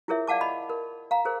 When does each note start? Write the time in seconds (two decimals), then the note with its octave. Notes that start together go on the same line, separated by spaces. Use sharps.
0.08 E4 F4 G#4 A#4 C#5 E5
0.27 D5 F5 F#5 A5 D6
0.41 D#5 B5
0.69 A#4
1.11 F5 A#5
1.25 G#4 A#4 C5